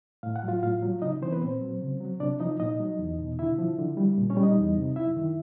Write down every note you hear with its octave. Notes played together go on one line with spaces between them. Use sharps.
A2 F5
F#5
F#3 F4 F5
A2 F4 F5
F#3
C#3 D#4 D#5
E3 C4 C5
B3 B4
A#2 C4 C5
F#3
C#3
F#3
C3 D4 D5
F3 D#4 D#5
A#2 D#4 D#5
F#3
E2
B2
D3 E4 E5
F3
D3
G3
A#2
C#4 C#5
G3
D#4 D#5
E2
C3
F#2 E4 E5
D#3